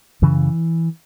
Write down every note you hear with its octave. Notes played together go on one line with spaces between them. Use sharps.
F#2 C#3 E3